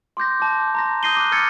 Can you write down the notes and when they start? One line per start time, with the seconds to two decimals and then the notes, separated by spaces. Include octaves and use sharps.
0.17 C6 D6 G6 A#6
0.40 A5 D6
0.75 A#5 C6 A#6
1.03 D#6 G6 A#6 C7 D#7 G7
1.16 D6 F#6
1.31 D6 E6 F6 G#6 A6 C#7